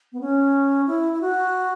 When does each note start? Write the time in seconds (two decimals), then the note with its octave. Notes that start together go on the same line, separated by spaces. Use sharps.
0.13 B3
0.20 C#4
0.87 E4
1.13 E4
1.21 F#4